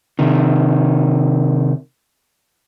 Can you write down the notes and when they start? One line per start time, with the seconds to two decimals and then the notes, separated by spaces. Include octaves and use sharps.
0.19 C3 D#3